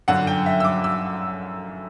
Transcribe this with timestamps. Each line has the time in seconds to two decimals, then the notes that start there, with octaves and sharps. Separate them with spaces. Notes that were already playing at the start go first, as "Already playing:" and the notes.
0.08 G1 F#2 D3 F#5
0.27 G5
0.46 E5
0.60 E6
0.64 D6
0.84 E6